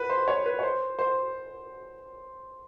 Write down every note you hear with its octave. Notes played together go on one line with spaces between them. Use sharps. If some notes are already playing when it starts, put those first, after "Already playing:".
Already playing: B4
C5
C#5
B4
C#5
C5
C5